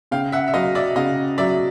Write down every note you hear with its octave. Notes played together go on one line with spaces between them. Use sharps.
C#3 F5 G5
E5 F#5
E5
F#3 D#5 F5
D5 E5
C#3 D#5 F5
F#3 D5 E5